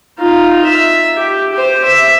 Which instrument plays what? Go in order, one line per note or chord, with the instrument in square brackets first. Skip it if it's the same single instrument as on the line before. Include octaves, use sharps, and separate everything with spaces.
[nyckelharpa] D#4 F4
E5
G4
G4 C5
E5